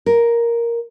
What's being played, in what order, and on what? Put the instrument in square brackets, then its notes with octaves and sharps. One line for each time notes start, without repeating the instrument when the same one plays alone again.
[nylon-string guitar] A#4